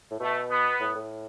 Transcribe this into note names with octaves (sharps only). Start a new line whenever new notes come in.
A2
B2 A3
B3
A2
A2